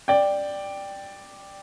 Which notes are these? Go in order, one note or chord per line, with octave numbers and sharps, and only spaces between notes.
D5 G5